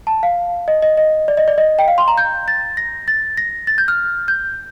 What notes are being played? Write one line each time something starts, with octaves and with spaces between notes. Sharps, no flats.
A5
F5
D#5
D#5
D#5
D5
D#5
D5
D#5
G5
F5
C6
A#5
G6
A6
A#6
A6
A#6
A6
G6
F6
G6